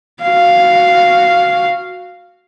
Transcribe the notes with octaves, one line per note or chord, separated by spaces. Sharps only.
F#4 F5